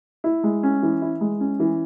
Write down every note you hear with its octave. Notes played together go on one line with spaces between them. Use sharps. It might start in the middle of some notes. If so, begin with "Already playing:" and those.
E4
G#3
C#4
E3
E4
G#3
C#4
E3